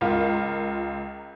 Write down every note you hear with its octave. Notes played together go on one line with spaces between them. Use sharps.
C#2 F4 A#4